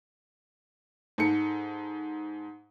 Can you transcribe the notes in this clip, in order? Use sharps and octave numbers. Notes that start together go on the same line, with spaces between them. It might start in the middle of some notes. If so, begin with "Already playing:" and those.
G#2 A4 C#7